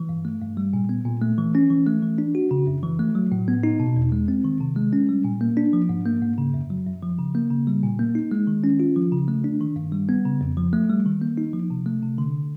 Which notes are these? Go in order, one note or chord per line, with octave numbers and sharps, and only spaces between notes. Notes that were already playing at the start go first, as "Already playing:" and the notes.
Already playing: E3
G2
A3
G2
G3
A#2
B3
A#2
A3
E3
C#4
E3
A3
E3
D4
F#4
C#3
F#2
E3
A3
F#3
A2
B3
D#4
B2
E2
G#3
C4
D#3
C3
G#3
C#4
G3
A#2
A#3
D4
F3
G#2
A#3
G#2
C#3
F#2
F#3
F#2
F3
C#3
A#3
C#3
G3
A#2
A#3
D#4
G#3
D#3
C#4
F4
F3
C#3
A3
D4
D#3
G2
G3
B3
C#3
F2
F3
A3
G3
D#3
A#3
D#4
F3
C3
A3
C3
D3